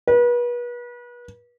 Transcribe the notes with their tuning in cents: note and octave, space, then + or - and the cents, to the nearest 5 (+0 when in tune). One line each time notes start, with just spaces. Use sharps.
B4 -35